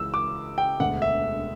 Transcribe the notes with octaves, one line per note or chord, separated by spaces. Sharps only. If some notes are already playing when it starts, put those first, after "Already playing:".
Already playing: C#2 C#3 E3 E6
D6
G5
E1 D2 D3 F#5
E5